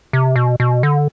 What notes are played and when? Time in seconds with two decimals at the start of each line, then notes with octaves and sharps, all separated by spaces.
0.13 C3
0.36 B2
0.60 B2
0.83 D3